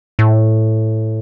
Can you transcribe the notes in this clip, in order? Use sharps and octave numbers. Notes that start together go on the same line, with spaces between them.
A2